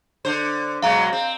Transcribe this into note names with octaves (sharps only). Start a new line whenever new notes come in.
D3 C5
B2 F#3 G#3 F5 A#5
C4